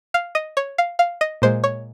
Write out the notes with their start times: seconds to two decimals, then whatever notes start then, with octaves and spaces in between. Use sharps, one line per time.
0.14 F5
0.35 D#5
0.57 C#5
0.78 F5
0.99 F5
1.21 D#5
1.42 A#2 G#3 C5
1.64 C#5